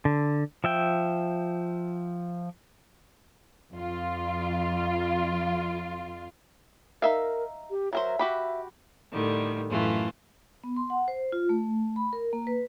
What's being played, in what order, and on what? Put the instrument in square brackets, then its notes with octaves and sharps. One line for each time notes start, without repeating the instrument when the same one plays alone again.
[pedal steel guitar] D3
F3 E5 G5
[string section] F2 F4
[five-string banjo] D#4 E5 F5 [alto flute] A#4
[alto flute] G4
[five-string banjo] F#3 A#4 C5 [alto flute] E5
[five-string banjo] F#4 G4 B5
[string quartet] A2 D3 D#3 G3
F#2 A2 E3 A3 F4
[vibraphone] B3
C6
F#5
C5
F4
A3
B5
A#4
A#3
B4